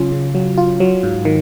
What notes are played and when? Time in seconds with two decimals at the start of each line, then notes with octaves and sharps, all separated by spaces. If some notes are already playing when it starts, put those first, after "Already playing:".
Already playing: C#3 F#3 C#4 F4
0.12 C#3
0.35 F#3
0.57 F4
0.80 F#3
1.03 G#2
1.25 D#3